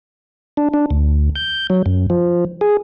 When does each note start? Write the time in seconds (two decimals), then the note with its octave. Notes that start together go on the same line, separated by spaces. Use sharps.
0.57 D4
0.74 D4
0.91 D2
1.36 G6
1.70 F#3
1.86 F#2
2.10 F3
2.61 G#4